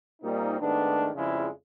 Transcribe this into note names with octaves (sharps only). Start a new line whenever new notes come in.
A#2 G3 A#3 C4 D#4
G#2 D#3 A3 B3 D4
F2 C#3 F3 G3 G#3 E4